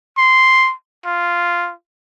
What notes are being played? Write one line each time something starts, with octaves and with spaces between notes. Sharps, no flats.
C6
F4